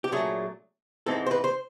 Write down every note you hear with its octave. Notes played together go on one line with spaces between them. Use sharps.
G4
A#2 F#3 A3 D4 G#4
G#2 E3 G#3 C4 D#4 A4
C5
B4
C5